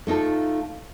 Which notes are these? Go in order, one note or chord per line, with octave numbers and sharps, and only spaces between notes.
A3 D#4 F4 A4